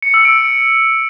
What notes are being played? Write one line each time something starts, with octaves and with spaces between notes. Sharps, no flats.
C#7
E6
D7